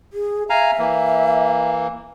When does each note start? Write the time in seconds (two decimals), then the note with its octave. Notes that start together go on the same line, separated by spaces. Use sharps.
0.13 G#4
0.50 E5 F5 G#5 A#5
0.78 E3 A#3